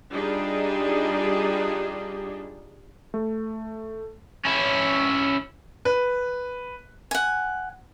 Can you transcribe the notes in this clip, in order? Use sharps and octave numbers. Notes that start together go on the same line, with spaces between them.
G3 D4 D#4 F4 G#4
A3
C#4 E4
B4
F#5 G#5